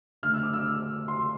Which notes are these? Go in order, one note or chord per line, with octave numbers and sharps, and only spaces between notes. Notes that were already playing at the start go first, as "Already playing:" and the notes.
D3 A3 D4 F6
E6
D6
E6
C6